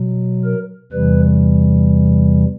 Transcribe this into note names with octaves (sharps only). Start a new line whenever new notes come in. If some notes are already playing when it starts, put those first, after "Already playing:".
Already playing: B2 F#3
A#4
E2 C3 E3 G3 B4